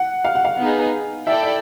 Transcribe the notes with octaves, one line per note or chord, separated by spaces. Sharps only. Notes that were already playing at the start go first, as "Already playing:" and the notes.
Already playing: F#5
F5
F#5
F5
B3 D#4 G#4
E4 A4 D5 E5 G5
E5